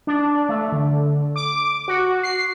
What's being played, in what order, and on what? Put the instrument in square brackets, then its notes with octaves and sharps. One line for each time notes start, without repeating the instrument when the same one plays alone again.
[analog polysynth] D4
A3
D3
D6
F#4
C7